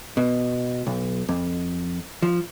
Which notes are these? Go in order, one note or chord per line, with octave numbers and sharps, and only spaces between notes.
B2
B1
F2
F3